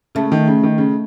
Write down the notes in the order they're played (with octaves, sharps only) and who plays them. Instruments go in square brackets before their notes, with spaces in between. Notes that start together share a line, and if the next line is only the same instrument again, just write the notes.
[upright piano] C#3 [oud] A3
[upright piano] D#3
C#3
D#3
C#3